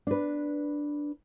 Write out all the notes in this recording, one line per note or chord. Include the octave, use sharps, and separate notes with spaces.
D4 B4